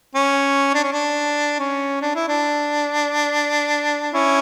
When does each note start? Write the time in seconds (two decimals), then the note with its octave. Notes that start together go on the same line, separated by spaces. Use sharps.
0.15 C#4
0.74 D4
0.84 C#4
0.92 D4
1.59 C#4
2.02 D4
2.15 E4
2.28 D4
4.14 C#4 E4